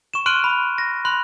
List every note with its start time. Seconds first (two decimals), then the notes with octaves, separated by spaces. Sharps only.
0.14 C#6 E7
0.26 C6 F6 F#6 D7 D#7 G7
0.44 B5
0.78 A#6
1.05 B5 C6 F#6